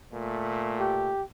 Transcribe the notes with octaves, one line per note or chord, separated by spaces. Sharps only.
A#2 A3
G4